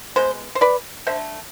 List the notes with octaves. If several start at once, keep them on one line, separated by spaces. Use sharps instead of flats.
B2 G#3 B3 C5
C5
B4 D5
D3 A3 C5 E5